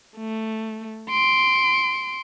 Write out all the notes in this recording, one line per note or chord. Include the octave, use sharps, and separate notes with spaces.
A3
C6 D7